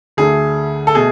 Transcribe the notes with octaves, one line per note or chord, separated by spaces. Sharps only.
D2 D3 A3 G#4
A4
B2 A3 G#4